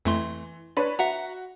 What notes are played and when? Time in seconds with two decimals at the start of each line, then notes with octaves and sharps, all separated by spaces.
0.05 F2 E3 A3 C6
0.77 D4 B4 C#5
0.99 F#4 E5 F#5 A#5